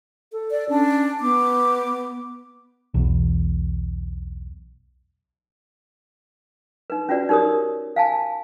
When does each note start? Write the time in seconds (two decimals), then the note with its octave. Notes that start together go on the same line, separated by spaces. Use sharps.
0.32 A4
0.50 D5
0.69 C#4 D4
1.21 B3 D6
2.94 B1 E2
6.90 D#4 B4
7.09 C#4 F4 F#4 B4 D5
7.29 D#4 G4 A#4 C#5 D#6
7.96 F5 G#5 A5